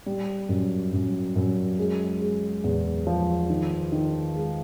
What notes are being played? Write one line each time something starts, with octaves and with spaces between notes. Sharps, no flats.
G3
F#2
F#2
F#2
G#3
G#3
E2
F3
D#3
D#3
G#3